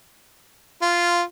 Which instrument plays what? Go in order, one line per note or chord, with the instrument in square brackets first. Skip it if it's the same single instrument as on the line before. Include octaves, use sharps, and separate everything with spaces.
[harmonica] F4